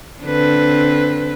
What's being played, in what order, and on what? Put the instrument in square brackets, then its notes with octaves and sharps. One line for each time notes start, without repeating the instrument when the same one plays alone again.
[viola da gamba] D3 C4 B4